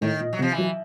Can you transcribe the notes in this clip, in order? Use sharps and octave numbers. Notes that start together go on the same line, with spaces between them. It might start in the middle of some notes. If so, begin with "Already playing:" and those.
A2 D#3
A#2
F#3
C3
F3
E3
F#3